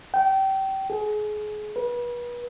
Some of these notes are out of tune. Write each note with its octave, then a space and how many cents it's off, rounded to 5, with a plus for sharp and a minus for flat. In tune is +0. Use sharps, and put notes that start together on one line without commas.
G5 -25
G#4 +30
B4 -35